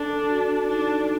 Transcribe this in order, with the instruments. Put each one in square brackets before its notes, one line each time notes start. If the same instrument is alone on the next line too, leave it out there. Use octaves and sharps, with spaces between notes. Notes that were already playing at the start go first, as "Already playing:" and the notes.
Already playing: [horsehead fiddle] D4 [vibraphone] A4
[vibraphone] F#4
[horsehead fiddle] D4 [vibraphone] D#4